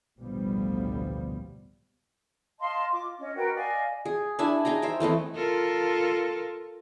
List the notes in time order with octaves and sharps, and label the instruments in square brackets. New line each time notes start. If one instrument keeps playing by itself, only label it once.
[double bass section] A1 D2 B2 F3 G3 B3
[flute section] D#5 F5 A5 C6
F4 D6
C#4 D#5
F#4 A#4 B4 G5
D5 D#5 F5 G#5
[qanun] G#4
D4 E4 E5 G#5
D#4 G#4 G5 A#5
C5 E5 G5
E3 A3 C4 D#5
[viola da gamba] F4 A4 A#4